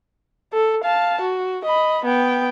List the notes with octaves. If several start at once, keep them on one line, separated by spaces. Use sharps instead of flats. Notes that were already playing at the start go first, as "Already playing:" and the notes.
A4
F5 A5
F#4
D#5 B5
B3 G5